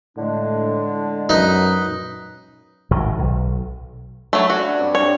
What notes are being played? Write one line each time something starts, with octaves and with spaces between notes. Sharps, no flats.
A2 D3 G#3 D4
F#2 D#4 B4
G#1 A2 D#3
B1
F#3 A3 E4
C#3 D4 F#4
G2 C3
C#5